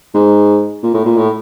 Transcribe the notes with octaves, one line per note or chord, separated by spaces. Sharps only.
G#2
A#2
A2
A#2
A2